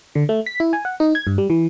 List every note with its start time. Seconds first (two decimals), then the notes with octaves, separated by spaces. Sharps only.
0.15 D3
0.29 A3
0.46 B6
0.60 E4
0.73 G#5
0.85 F#5
1.00 D#4
1.15 G#6
1.27 G2
1.38 G3
1.50 E3